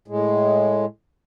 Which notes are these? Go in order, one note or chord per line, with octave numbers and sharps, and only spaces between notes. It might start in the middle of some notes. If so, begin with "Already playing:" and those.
A2 G#3